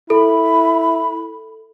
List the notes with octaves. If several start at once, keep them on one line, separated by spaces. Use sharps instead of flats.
E4 A4 B5